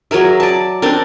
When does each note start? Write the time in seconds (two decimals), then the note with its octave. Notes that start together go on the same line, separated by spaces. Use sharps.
0.11 F#3 G#4 A#4 E5
0.40 D5 A5
0.82 C4 D4 A4 A#4